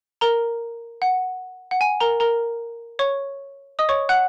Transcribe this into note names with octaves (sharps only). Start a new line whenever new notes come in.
A#4 A#5
F#5
F#5
G#5
A#4 A#5
A#4 A#5
C#5 C#6
D#5 D#6
C#5 C#6
F#5 F#6